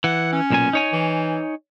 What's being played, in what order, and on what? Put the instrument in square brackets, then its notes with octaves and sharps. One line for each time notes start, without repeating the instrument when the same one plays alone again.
[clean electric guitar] E3 [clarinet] F#5
[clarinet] C#4
[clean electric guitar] B1 A#2 G#5
D#4 C#5 G#5
[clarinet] E3